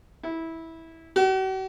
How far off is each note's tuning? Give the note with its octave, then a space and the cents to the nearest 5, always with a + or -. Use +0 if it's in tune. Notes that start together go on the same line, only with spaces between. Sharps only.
E4 -15
F#4 +45